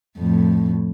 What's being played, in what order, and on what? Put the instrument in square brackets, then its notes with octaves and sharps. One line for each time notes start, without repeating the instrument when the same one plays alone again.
[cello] F2 A2